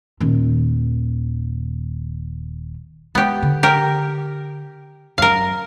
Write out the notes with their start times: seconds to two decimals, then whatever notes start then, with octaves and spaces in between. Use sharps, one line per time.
0.20 D#1 D#3
3.15 G#3 B3 G4
3.42 D3
3.63 G4 A#4
5.18 F#2 A#4 F5